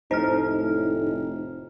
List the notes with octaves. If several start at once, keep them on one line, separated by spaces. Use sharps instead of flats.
F1 A2 D#4 C5 F6